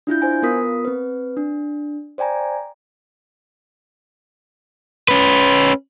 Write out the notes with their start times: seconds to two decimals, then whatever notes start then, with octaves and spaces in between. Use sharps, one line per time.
0.07 D4 E4 F4 G6
0.22 C5 G#5
0.42 B3 F4 A#4 D#6 B6
0.85 C4 B4
1.37 D4
2.18 C5 D5 G5 G#5 A#5
5.08 C#4 B4